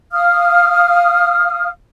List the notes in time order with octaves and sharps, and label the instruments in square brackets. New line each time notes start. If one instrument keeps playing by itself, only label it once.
[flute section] F5 D#6 F6